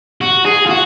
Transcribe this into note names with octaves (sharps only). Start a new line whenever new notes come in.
F#4
G#4
F4
F#4